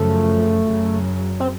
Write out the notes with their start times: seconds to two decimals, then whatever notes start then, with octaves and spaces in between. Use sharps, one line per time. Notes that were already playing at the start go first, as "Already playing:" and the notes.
Already playing: F#2 C#3 F3 A3
0.65 F#2 C#3 F#3
1.40 C4